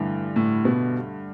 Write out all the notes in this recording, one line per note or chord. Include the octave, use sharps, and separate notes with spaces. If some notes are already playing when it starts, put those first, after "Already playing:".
Already playing: G2 D3 E3 A3
A2
B2